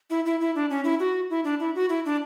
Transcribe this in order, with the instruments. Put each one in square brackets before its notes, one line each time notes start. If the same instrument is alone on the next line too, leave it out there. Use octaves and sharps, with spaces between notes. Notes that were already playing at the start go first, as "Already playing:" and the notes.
[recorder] E4
E4
E4
D4
C#4
E4
F#4
E4
D4
E4
F#4
E4
D4